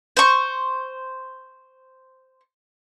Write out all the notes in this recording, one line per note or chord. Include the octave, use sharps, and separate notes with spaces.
C5 C#6